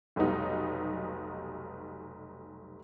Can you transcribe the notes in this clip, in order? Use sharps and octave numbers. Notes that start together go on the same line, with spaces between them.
F1 B1 F#3 G3 B3 D#4